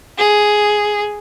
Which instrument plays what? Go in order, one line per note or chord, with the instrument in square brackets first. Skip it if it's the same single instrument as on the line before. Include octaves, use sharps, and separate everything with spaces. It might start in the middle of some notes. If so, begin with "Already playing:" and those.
[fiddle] G#4